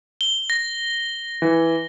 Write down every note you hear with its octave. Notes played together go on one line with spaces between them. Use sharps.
G7
A#6
E3